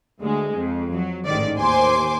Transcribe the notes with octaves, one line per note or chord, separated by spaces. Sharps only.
D2 G#3
F2
F#3
A1 G#2 D#3 D5
D#2 C5 G#5 C6 D6